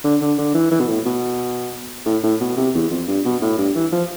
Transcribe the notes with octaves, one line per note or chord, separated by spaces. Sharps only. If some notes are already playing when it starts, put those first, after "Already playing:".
D3
D3
D3
E3
E3
B2
A2
B2
A2
A2
B2
C3
E2
F2
G2
B2
A2
G2
E3
F3